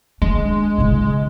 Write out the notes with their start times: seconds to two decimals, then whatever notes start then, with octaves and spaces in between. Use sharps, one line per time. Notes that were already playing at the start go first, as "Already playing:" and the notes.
0.22 G#3 D4
0.78 C#3 E4